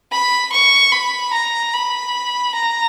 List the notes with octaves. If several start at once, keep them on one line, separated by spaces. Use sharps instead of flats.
B5
C#6
B5
A#5
B5
A#5